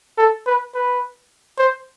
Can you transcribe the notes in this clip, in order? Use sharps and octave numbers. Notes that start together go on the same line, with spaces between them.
A4
B4
B4
C5